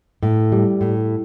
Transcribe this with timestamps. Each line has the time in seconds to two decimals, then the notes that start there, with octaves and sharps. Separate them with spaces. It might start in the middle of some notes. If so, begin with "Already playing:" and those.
0.23 A2
0.52 G3
0.81 A2